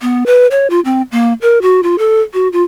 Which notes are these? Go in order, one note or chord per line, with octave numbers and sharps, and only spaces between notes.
B3
B4
C#5
F4
C4
A#3
A#4
F#4
F4
A4
F#4
F4